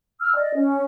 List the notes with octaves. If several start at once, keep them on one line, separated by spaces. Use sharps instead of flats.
E6 F6
D5 D#5
C#4